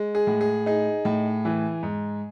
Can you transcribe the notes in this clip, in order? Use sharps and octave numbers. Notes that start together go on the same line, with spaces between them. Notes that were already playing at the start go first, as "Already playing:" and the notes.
Already playing: G#3
G#4
A2
G#4
D#4 G#4
A2
E3
G#2